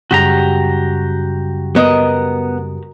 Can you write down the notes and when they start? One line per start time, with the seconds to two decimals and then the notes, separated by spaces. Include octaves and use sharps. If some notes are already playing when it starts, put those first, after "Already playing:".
0.11 F#2 C#3 G3 F#4 G4 A#5
1.76 B3 A#4 D#5